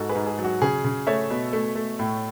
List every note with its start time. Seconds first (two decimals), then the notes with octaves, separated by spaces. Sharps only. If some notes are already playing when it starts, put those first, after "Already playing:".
Already playing: G#2 F#4 A4
0.09 G#4 B4
0.15 G#2
0.26 G#4
0.39 F#3
0.44 F#4
0.62 C#3 G#4
0.84 C#3
1.07 A3 C#5 E5
1.30 B2
1.53 A3
1.75 A3
1.99 A2